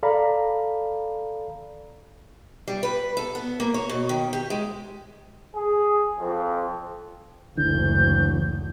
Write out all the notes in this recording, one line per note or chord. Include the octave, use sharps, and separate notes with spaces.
A4 D5 F5 A#5 B5
G3
B4
A4
B3
A#3
C#5
B2
D#3
G4
G#3
G#4
F2
F#1 D2 D3 E3 G6